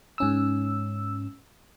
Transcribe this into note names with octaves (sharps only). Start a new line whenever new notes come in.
G#2 C#4 E6